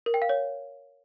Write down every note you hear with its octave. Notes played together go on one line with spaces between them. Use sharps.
A#4
G5
F5
C#5